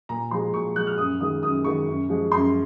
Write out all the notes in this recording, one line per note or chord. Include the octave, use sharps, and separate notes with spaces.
A#2 A#5
F3 G#3 C6
A#2 C#6
F3 G#3 F#6
F6
F#2 D#6
D#3 G#3 D#6
F#2 D#6
D#3 G#3 C#6
F#2
F3 G#3
F#2 C6